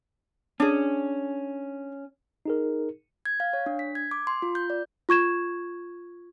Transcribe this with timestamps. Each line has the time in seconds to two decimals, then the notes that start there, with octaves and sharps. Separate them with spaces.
0.60 C#4 D4 G#4
2.46 D#4 G#4 A#4
3.25 G#6
3.40 F5
3.53 C#5
3.66 D4
3.79 B6
3.95 G#6
4.11 D6
4.27 C6
4.42 F4
4.55 G6
4.70 D5
5.09 F4 C#6 G#6 E7